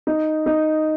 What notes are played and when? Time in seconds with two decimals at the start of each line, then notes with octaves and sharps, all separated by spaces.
0.07 D#4
0.46 D#4